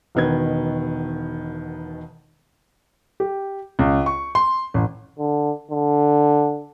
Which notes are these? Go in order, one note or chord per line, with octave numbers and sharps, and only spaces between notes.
E1 B2 D#3 B3 G#6
G4
C#2
C#6
C6
A1
D3
D3